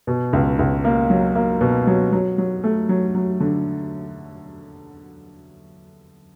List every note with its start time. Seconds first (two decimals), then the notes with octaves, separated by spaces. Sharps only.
0.07 B2
0.33 C#2
0.59 C#2
0.84 A#3
1.10 F#3
1.35 A#3
1.61 B2
1.87 F#3
2.12 F#3
2.38 F#3
2.64 A3
2.89 F#3
3.15 F#3
3.40 D3